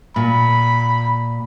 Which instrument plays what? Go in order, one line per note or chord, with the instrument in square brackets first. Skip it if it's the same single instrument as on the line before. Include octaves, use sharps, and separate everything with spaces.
[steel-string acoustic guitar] A#2 [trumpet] B5